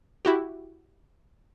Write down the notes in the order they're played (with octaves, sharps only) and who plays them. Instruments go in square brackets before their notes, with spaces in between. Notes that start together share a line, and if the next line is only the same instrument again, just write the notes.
[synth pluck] E4 F#4 G4